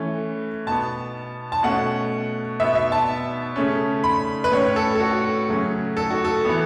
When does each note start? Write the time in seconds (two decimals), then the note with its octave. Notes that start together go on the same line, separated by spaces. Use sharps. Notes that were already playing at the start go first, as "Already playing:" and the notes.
Already playing: E3 A3 C#4
0.67 B2 B3 A5
1.52 A5
1.63 B2 A3 C#4 F#5
2.60 B2 B3 E5
2.75 E5
2.92 A5
3.56 C#3 A3 C#4
4.04 B5
4.44 B4
4.52 A2 A3 C#4 C#5
4.76 A4
4.95 A4
5.00 F#4
5.49 C#3 F#3 A3 C#4
5.97 A4
6.10 F#4
6.25 A4
6.45 E3 B3